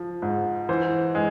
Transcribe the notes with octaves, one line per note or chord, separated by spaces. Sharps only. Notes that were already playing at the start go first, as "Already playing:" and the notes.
Already playing: F3
G#2
E3 C5
G#3